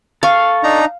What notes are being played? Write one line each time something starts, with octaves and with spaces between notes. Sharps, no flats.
A4 F5 C#6
D4 D#4 A#5